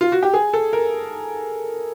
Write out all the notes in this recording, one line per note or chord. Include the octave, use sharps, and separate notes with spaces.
F4
F#4
G4
G#4
A4
A#4